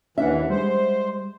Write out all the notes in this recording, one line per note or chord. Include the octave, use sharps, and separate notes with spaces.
D#2 E3 C#4 D4 E5 F#5
G3 G#3 C5